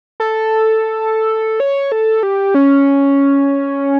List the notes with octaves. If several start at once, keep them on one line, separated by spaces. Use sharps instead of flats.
A4
C#5
A4
G4
C#4